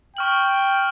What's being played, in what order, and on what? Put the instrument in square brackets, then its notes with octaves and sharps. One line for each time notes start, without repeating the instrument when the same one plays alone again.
[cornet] G5 [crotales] C#6 F6 F#7